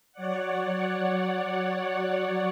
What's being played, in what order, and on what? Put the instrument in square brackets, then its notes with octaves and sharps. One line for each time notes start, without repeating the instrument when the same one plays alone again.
[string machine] F#3 C#5 D5 F#5